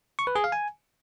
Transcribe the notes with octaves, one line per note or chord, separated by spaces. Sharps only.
C#6
B4
G#4
F5
G#5